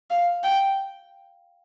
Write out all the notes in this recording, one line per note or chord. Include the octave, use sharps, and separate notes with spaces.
F5
G5